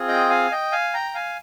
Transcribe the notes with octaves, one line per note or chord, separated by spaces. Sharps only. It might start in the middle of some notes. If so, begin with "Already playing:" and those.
Already playing: C4 F4 G#4
D#5 G5
F5 G#5
D#5 G5
F5 G#5
G5 A#5
F5 G#5